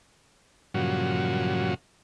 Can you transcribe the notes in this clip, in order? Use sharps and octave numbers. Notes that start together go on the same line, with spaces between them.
G2 A#2 C#3 F3 F#3 F#4